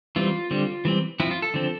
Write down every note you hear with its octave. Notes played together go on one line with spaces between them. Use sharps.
E3 G3 C4 F4
D3 G3 C4
E3 G3 C4
F3 C4 E4
F4
A4
D3 F3 C4